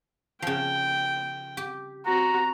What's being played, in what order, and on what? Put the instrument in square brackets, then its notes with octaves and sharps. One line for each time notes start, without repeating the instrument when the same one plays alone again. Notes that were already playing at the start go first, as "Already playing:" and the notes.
[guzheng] C#3 F3 [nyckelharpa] G5
[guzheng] G4
[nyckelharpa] C4 F#4 [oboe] A#5